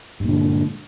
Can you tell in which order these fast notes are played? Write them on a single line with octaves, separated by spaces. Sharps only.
G2 A#2 D3 G#3